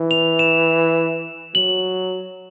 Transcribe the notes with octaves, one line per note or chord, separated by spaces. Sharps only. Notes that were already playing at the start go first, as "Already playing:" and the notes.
Already playing: E3
F7
E7
F#3 F#7